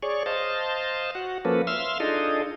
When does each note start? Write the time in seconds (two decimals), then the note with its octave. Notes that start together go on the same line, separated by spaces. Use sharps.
0.02 G#4 C#5 D5 C#6
0.26 C5 D#5 F5 A5
1.15 F#4 F#5
1.45 F3 A#3 C#4 A4 B4
1.67 E5 F5 C6 E6 F6
2.00 D4 D#4 F4 G#4 A4 D#5